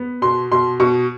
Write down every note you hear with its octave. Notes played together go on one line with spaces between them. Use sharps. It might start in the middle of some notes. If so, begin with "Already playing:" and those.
Already playing: B3
B2 C6
B2 C6
B2 C#6